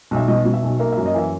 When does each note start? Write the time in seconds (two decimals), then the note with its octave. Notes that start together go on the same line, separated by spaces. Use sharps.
0.11 B1
0.16 E5
0.28 B2 D#5
0.45 B2
0.54 E5
0.63 B1
0.79 A#3 E5
0.92 E5
0.97 F#2
1.06 D#5
1.14 E3 E5